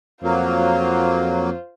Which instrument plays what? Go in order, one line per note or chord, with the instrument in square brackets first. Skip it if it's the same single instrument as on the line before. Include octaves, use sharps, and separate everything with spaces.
[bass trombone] F2 [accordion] F#3 A#3 [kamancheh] F4 C5